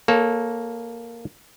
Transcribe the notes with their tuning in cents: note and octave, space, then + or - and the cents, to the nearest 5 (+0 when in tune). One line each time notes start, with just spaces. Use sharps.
A#3 +0 A4 -15 C#5 +0